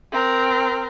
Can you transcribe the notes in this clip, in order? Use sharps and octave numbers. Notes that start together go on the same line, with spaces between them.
C4 A#4